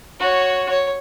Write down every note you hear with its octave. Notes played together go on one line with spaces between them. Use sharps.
F#4 C#5
C#5